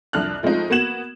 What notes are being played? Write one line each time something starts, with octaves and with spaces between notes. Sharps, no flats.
C2 F2 D4 F6 F#6
F3 G#3 A3 C4 D#4 F4
A#3 B3 F#4 G#6 E7 F#7